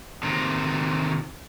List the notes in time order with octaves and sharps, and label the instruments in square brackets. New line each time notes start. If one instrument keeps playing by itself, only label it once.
[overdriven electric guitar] C3 D#3